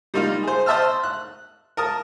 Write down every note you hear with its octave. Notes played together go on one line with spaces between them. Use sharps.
G3 A#3 D#4 F4
G#4 C5
C5 D#5 E5 A5 E6 F6
F#6
A#4 A5 D#6